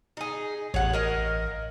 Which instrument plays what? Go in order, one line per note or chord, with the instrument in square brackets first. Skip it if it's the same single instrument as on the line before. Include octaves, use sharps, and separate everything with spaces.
[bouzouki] D#4 G#4
[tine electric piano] A1 [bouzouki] C#5 F#5
[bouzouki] A#4 D#5 F5